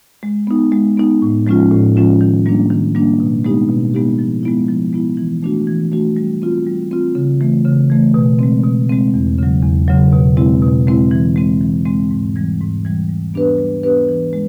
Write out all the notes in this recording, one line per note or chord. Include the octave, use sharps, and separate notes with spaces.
G#3
B3 D#4
G#3
B3 D#4
A2
F3 G#3 C#4 F4
A2
F3 G#3 C#4 F4
D#3
G3 A#3 D4
D#3
G3 A#3 D4
B2
G#3 B3 D#4 G4
B2
G#3 B3 D#4 G4
F3
G#3 B3 E4
F3
G#3 B3 E4
E3
A3 D4 F#4
E3
A3 D4 F#4
G3
C4 F4
G3
C4 F4
C#3
E3 A3
C#3
E3 A3
B2
G#3 C4
B2
G#3 C4
E2
C#3 F#3
E2
C#3 F#3
B2
G#3 C4 E4
B2
G#3 C4 E4
E3
G#3 C4
E3
G#3 C4
G#2
E3 G3
G#2
E3 G3
G3
B3 D4 G4 B4
G3
B3 D4 G4 B4
E3
G#3